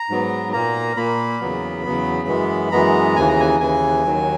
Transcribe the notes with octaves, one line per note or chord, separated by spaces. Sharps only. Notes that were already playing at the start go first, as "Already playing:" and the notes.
Already playing: A#5
G#2 F#3 B3
A#2 A#3 A#5
A#2 A#3 B5
E2 C#3 F#3 B3
E2 C#3 F#3 B3
F#2 E3 G#3 B3
F#2 E3 G#3 B3 A#5
D#2 C#3 E3 G#5
A#5
G#5
D#2 C#3 E3 G#5
D#2 D#3 F#3